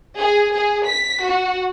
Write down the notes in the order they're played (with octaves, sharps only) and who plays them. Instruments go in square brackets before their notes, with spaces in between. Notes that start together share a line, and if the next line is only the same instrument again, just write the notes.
[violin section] G#4
G#4
B6
F#4